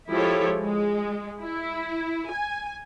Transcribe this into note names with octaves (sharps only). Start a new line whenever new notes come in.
F3 G#3 E4 G4 A4 C#5
G#3
E4
G#5